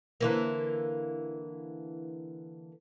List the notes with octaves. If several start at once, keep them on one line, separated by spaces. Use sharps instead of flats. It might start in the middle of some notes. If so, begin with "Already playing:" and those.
D3 E3 A#3